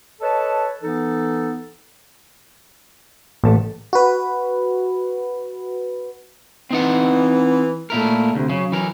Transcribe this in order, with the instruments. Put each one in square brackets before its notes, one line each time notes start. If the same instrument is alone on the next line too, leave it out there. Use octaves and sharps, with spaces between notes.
[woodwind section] A4 B4 C#5 D#5 A5
E3 B3 D#4 A4
[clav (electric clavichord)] A1 A5 [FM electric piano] A2 A3
[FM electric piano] F#4 B4
[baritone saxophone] E3 [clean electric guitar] C4 D#4 F#5
[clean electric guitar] A#2 E4 A#4 [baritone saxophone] A3
[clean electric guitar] D2 [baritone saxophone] C3
[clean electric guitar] C#3 [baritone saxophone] F#3
[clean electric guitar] E3 A#4